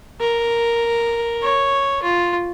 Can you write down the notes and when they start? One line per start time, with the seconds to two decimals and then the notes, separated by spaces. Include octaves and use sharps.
0.20 A#4
1.42 C#5
2.03 F4